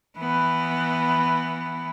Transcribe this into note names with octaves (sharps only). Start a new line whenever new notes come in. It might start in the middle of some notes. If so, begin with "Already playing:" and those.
E3 B3